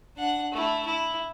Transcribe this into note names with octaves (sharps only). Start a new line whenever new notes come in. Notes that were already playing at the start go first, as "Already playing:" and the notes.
D4 F#5
A3 E4
E4